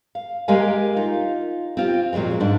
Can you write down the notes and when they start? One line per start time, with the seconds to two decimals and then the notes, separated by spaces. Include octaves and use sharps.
0.15 F5
0.48 G#3 A#3 G4 A#4 F5 G#5
0.96 D#4 F4
1.77 C4 F4 G4
2.13 F2 A#2 F#3 G#3 C4
2.40 G#2 D4